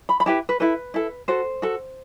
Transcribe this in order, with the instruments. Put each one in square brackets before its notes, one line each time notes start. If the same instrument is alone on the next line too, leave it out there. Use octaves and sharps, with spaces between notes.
[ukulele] B5
B5
E4 G4 B4 A5
B4
E4 A4 B4
E4 A4
F#4 A4 C5
F#4 A4